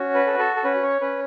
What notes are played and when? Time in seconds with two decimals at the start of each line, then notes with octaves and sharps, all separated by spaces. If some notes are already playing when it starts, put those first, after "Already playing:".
Already playing: C#4 F#4
0.14 B4
0.27 A4
0.39 A4
0.56 A4
0.64 C#4 B4
0.83 C#5
1.01 C#4 B4